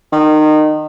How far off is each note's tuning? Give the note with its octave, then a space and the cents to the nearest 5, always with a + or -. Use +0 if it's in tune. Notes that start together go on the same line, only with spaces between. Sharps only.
D#3 -25